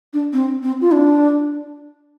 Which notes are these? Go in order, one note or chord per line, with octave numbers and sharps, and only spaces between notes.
D4
C4
C4
F4
D4